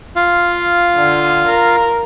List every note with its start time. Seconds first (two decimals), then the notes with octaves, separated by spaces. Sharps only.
0.16 F4 F5
0.96 D3
1.47 A#4